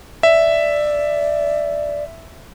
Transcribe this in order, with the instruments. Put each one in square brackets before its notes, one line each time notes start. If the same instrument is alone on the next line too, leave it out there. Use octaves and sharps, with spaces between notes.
[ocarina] D5 [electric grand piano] E5